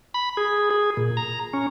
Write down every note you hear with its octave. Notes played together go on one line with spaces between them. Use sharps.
B5
G#4
G#4
A#2
A#5
C#4